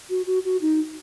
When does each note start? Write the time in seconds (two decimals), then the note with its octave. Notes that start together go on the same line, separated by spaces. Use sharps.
0.10 F#4
0.27 F#4
0.45 F#4
0.61 D#4